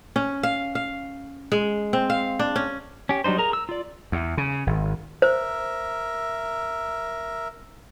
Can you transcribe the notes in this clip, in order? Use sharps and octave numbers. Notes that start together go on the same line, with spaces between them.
C#4
F5
F5
G#3
C4
F5
D4
C#4
C#4 G4
F#3 G3 D4 D#4 C5
G#4 A#4 A#5
E6
F4 D5
E2
C#3
G#1
A#4 C5 E5